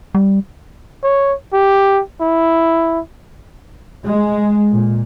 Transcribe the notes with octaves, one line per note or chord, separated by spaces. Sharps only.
G3
C#5
G4
E4
G#3
A#2